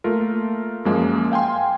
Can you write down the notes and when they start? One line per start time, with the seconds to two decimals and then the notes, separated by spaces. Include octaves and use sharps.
0.04 A3 A#3 F4 A#4
0.85 F#2 F3 G#3 A#3
1.32 F5 G5 G#5 C6